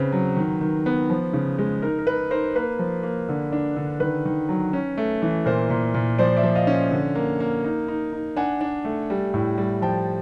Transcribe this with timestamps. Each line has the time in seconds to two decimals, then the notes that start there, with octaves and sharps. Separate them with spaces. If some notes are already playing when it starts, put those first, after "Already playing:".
Already playing: C#3 C4 B4
0.12 F#3
0.37 D#3
0.61 D#3
0.86 B3
1.10 F3
1.33 C#3
1.59 G#3
1.82 D#4 A#4
1.99 A#4
2.07 D#4 B4
2.31 D#4 A#4 C5
2.55 A#3 B4
2.79 F3
3.03 A#3
3.28 D3
3.52 D4
3.76 D3
4.00 D#3 B4
4.25 D#3
4.49 F#3
4.73 C#4
4.98 A3
5.22 E3
5.45 A#2 A#4 C5
5.70 A#2
5.94 A#2
6.18 F3 C5 D5
6.37 D5 E5
6.43 F3
6.55 D#5 F5
6.67 C#4
6.91 D3
7.15 A#3
7.40 A#3
7.64 D#4
7.88 D#4
8.13 D#4
8.36 D4 F#5 G#5
8.61 D4
8.85 A3
9.10 G3
9.34 A2
9.58 G3
9.82 F3 G5 A5